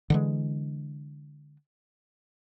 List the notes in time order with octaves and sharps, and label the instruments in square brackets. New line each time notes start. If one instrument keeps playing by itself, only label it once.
[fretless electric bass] D3 E3 G#3